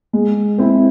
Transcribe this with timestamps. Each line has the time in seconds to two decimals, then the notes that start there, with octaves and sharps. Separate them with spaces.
0.13 G#3
0.58 C4 E4